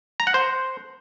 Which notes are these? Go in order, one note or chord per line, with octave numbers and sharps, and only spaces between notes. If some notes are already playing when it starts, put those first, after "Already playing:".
A#5
F#5
C5